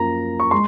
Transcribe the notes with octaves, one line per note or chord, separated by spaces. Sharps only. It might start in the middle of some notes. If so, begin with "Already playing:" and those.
Already playing: F#2 F3 A#3 A#5
C#6
G#3 C6